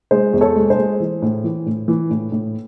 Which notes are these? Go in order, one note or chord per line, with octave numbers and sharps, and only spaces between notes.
G#3 G#4 C5
E2
A4 C#5
G#3
G#4 C5
G#3
E3
A2
E3
A2
E3
A2
A2